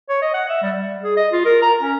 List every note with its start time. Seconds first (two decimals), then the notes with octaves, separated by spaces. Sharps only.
0.09 C#5
0.22 D#5
0.34 F#5
0.49 E5
0.62 G3
0.75 G3
1.03 G#4
1.16 D#5
1.33 F4
1.45 A#4
1.62 A#5
1.81 C#4